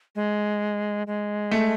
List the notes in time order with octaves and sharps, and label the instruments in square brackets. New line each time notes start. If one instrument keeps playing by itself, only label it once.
[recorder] G#3
G#3
[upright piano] A3